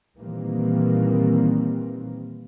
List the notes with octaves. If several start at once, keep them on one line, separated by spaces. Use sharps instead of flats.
A#2 D#3 E3 G3 A#3 C4